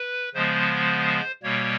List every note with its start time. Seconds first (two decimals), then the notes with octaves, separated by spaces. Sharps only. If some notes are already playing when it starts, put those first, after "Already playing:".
Already playing: B4
0.34 C#3 F3 G#3 B3 C5
1.43 B2 G3 A#3 C#5